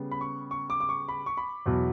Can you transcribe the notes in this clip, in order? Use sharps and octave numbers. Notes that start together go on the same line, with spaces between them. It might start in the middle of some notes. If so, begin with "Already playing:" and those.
Already playing: C#3 G3 B3
B5
C#6
C#6
D6
D6
C#6
B5
C#6
B5
E2 B2 F#3